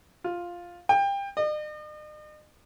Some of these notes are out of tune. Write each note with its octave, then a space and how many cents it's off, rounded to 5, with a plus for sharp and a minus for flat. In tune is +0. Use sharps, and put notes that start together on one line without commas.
F4 +0
G5 +25
D#5 -45